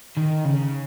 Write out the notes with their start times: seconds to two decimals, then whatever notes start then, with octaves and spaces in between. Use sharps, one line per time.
0.17 D#3
0.44 C#3